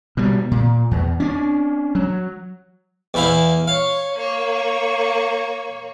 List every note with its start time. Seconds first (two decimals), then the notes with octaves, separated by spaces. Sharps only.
0.17 B2 G3
0.51 A#2
0.91 E2
1.20 C#4 D4
1.95 F#3
3.14 E2 E4 F5
3.68 C#5 F5
4.13 A#3 C#5